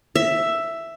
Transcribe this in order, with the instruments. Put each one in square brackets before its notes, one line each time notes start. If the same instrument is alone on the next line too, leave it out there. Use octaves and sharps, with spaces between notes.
[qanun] E5